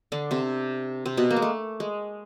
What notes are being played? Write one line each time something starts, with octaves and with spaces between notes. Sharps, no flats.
D3 D4
C3 C4
C3 C4
B2 B3
A#3
G#3
A3
G#3